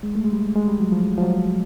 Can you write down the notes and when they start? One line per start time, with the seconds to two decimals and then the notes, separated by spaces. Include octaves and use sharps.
0.03 G#3
0.15 A3
0.24 G#3
0.33 G3
0.55 G#3
0.68 G3
0.80 F#3
0.92 F3
1.18 F3
1.22 F#3